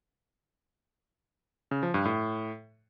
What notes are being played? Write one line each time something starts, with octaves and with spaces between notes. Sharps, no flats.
C#3
F3
G2
A2